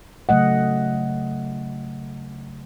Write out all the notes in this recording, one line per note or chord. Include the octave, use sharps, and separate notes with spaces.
C#3 F#3 A3 D#5 F#5